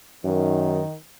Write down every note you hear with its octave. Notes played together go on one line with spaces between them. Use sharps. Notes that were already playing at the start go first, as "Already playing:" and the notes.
F#2 D#3